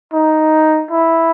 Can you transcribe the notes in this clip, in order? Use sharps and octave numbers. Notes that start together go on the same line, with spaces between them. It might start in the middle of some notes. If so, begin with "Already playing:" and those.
D#4
E4